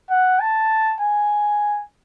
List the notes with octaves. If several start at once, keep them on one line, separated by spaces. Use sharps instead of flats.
F#5
A5
G#5